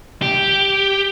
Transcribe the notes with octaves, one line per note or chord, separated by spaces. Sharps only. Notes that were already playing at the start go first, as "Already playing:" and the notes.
G4